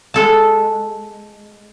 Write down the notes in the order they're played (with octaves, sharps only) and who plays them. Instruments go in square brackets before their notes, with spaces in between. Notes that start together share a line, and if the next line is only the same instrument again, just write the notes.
[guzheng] G#3 A4 A5